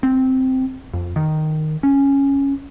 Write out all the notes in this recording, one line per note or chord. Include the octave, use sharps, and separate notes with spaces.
C4
F2
D#3
C#4